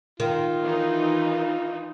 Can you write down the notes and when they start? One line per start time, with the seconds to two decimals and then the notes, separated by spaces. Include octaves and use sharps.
0.20 D#3 F4
0.63 E3 D#4